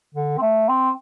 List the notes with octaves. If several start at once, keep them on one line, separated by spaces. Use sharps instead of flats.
D3
C4
A3
C4